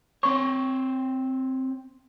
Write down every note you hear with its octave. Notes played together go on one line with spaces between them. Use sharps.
C4 C#5 C#6